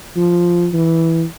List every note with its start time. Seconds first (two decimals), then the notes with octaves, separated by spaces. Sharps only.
0.17 F3
0.73 E3